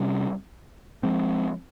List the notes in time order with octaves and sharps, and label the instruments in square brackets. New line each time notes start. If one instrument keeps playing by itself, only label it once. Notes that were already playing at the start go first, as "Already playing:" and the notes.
Already playing: [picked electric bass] C3 G3 C#4
F3 G#3 C4